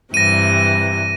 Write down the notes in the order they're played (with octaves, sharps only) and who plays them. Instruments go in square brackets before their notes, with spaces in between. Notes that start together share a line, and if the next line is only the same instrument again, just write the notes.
[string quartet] G2 C3 E3 [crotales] A#6 D#7